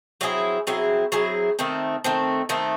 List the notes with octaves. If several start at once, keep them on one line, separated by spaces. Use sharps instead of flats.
F#3 C4 E4 G#4
F#3 C4 E4 G#4
F#3 C4 E4 G#4
D#3 A3 C4
D#3 A3 C4
D#3 A3 C4